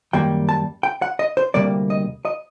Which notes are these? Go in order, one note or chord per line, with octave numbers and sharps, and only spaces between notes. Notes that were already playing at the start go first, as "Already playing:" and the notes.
F#2 D#3 G3 A#3 G5
A5
G5
F#5
D#5
C5
D2 C3 G3 A#3 D5
D#5
D#5